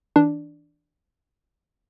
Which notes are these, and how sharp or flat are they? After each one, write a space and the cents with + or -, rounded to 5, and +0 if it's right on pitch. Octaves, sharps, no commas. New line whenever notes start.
E3 -30 D4 +0